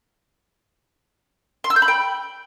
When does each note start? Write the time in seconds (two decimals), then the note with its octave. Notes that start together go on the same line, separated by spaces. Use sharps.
1.64 C6
1.70 E6
1.76 G6
1.82 B5
1.88 G5